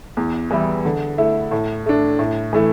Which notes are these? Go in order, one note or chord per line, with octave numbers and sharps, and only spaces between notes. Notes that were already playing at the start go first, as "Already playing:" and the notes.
E2
E3 G3 E4
D3
A3 E4
A2
A3 D4
A2
E3 A3 E4